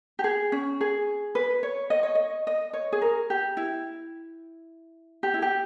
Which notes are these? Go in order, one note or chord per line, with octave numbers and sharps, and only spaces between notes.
G4
G#4
C#4
G#4
B4
C#5
D#5
C#5
D#5
D#5
C#5
G#4
A#4
G4
E4
G4
E4
G4